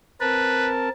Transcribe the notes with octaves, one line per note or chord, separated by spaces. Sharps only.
C4 A#4 B4 A5